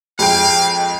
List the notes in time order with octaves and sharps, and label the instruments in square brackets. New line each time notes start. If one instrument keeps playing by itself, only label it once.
[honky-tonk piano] F2 G#3 G5 [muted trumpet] F5